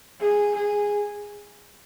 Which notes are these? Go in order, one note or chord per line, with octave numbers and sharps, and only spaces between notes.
G#4
G#4